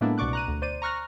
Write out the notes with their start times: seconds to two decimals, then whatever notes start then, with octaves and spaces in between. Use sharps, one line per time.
0.01 A2 G#3 A#3 B3 D4 E4
0.18 C2 B2 D5 C#6 D6 F#6
0.33 A#5 F#6 D#7
0.48 D2
0.62 C5 D5 D#7
0.82 A#5 C#6 F6 F#6 A#6